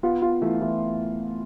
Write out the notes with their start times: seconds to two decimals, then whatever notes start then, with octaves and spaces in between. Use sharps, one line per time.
0.03 B3 F4
0.22 F4
0.42 E3 A3
0.61 E3